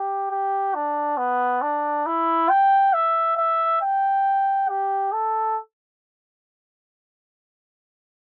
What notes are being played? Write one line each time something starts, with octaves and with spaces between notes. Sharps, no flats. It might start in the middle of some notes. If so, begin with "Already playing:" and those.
Already playing: G4
G4
D4
B3
D4
E4
G5
E5
E5
G5
G4
A4